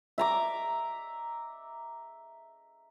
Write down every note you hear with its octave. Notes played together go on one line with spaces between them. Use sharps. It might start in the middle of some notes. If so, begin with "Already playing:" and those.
E5 A#5 D6